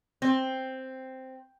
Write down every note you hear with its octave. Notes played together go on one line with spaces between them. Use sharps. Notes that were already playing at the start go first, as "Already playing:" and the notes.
C4